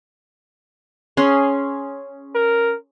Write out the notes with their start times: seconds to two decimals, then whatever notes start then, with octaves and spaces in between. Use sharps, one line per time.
1.17 C#4 G#4 C6
2.35 A#4